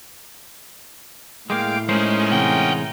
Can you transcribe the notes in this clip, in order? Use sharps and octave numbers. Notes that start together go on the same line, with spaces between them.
A2 G#3 A#3 F5 G5 D6
G#3 C#4 D#4 A#4 C5
C3 E3 G#3 F#5 G5